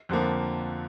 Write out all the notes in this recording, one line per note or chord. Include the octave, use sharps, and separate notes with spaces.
F2 D3 F3 A#3